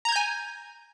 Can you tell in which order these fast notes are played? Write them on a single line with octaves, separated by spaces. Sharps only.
A#5 G#6 G6 G#5